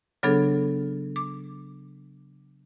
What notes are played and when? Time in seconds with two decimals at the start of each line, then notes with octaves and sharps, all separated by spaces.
0.23 C#3 F#3 B3 D4 G#4 A4
1.16 D6